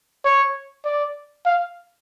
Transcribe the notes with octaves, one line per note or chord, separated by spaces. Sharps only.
C#5
D5
F5